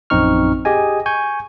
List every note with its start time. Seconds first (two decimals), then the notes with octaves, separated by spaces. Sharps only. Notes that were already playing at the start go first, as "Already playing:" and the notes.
0.10 A#1 F#2 C4 D#4 C#6 F6
0.65 G4 G#4 D#5 G#5
1.06 G#5 C#6 G6